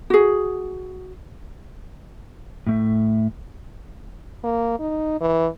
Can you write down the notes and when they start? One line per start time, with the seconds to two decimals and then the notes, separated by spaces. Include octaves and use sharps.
0.10 F#4 G#4
2.67 A2 A3 E5
4.44 A#3
4.79 D#4
5.21 E3